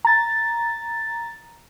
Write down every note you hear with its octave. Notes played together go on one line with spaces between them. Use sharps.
A#5 A6